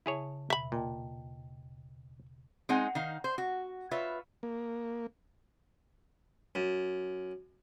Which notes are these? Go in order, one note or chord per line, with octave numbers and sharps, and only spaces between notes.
C#3 E4 G#4 C#5 A5
D#2 B2 E5 B5
A#2 D#5 G5 A5
G#3 C4 D#4 F#5 G#5
D#3 D#4 F5
C5
F#4
F4 B4 C#5 E5
A#3
F#2